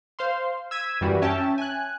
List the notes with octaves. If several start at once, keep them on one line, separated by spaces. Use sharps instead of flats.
C5 F5 C6
E6 G#6 B6 D#7
F#2 E3 G3 F#4
C#4 E5 G5 A5
G#5 F#6